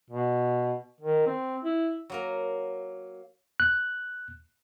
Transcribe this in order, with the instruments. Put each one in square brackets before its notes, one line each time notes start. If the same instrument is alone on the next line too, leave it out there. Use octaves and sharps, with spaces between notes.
[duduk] B2
D#3
C4
E4
[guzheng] F#3 A#3 A#4
[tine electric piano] F#6